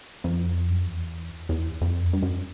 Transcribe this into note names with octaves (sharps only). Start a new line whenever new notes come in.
F2
F#2
F2
E2
E2
F2
G2
F#2